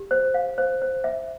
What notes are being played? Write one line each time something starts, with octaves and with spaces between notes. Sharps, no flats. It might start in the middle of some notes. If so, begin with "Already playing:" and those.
Already playing: G4
C5
F5
C5
C5
E5